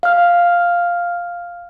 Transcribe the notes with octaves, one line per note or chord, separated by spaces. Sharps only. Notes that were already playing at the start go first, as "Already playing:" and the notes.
F5 F6